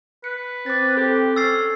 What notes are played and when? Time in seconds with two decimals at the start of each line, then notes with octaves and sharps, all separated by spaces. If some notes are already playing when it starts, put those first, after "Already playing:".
0.24 B4 C#7
0.66 C4 D6 A6
0.97 G4 A4
1.36 C#4 E6 A6 C7